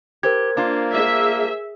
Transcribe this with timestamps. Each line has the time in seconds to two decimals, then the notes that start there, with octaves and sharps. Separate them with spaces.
0.23 G4 A#4 C5 G#6
0.57 A#3 D4 F4
0.94 G#4 E5